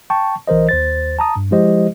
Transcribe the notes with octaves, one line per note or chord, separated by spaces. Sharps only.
G5 A5 C#6
B1 E3 A#4 C5 D#5
D#2 C5 A6
A5 A#5 D#6
G2
F3 G#3 E4 G4 C5 D#5